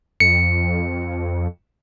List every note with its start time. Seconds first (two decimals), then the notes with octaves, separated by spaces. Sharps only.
0.20 F2 C#7